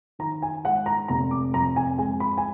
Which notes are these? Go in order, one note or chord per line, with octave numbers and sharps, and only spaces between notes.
D#3 A#5
G#5
G#3 F#5
A#5
F1 A#5
D6
F2 A#5
G#5
G#3 G#5
B5
G#5